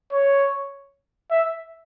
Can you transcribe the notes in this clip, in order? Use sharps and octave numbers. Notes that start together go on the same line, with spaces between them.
C#5
E5